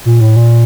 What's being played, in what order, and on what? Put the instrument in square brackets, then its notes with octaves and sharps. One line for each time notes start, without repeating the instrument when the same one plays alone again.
[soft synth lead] A#2
A2
A#2